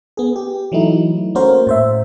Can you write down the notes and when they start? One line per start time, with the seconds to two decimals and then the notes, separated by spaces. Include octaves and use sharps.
0.17 B3 G#4
0.36 G4
0.72 E3 F#3 A3 D#4 E4
1.35 A3 A#3 C#4 F#4 A#4 C5
1.67 A2 C5 E5